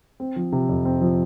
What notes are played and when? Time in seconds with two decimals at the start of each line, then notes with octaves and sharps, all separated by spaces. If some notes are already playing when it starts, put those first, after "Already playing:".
0.20 C4
0.36 F3
0.52 C3
0.69 F2
0.85 C4
1.02 F3